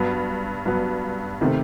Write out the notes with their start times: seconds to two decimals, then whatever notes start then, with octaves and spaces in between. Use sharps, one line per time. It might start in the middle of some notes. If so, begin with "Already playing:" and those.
Already playing: G2 F#3 B3
0.66 G2 F#3 B3
1.41 C3 D#3 A3 C4